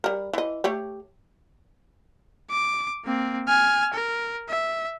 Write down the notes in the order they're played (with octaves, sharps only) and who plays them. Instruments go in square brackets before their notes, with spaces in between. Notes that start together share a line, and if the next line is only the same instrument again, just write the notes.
[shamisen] G3 A#4
E3 D#5
A3 G4 C#5
[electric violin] D6
A#3 C4
G#5 F6
A#4
E5